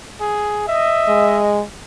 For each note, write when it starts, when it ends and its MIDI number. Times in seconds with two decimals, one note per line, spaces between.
0.21 0.66 68
0.68 1.50 75
0.68 1.42 76
1.08 1.62 56